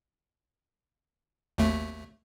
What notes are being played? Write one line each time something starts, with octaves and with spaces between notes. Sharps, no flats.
G#1 D#2 A3